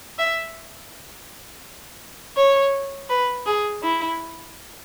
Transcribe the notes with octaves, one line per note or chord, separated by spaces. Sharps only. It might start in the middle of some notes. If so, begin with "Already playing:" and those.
E5
C#5
B4
G#4
E4